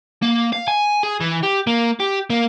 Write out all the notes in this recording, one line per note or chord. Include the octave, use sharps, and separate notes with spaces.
A#3
F5
G#5
G#4
E3
G4
A#3
G4
A#3